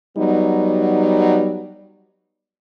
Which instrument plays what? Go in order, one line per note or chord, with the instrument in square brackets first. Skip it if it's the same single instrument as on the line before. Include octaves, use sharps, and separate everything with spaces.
[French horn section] F#3 G3 B3 D#4